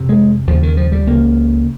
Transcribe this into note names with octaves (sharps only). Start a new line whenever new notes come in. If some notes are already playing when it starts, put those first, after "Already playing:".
Already playing: F2 C3
G#3
D#2 C#3 F3
D#3
F3
G3
C#2 C#3 A#3